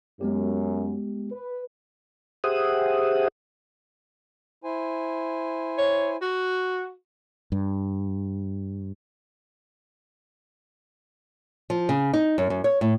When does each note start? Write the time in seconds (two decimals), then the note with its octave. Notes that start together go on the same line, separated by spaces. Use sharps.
0.21 F#2 G#3 B3 G4
1.32 B4
2.44 G4 G#4 C5 E5 F#5 D#6
4.64 E4 C5 G#5
5.78 C#5
6.22 F#4
7.52 G2
11.70 F3
11.89 C#3
12.13 D#4
12.38 F#2
12.50 F#2
12.64 C#5
12.81 A2